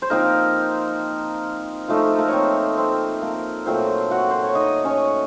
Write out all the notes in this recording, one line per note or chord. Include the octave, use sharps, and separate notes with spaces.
C5
F3 A#3 C4 D#4 A#4
F3 A3 D#4 C5
A#4
A4
A#3 A#4
C4 C5 C#5
C4 C5
A#3 A#4
A#2 F#3 A3 C4 C5
F#4 F#5
C5
C#5
D#4 D#5
C#4 C#5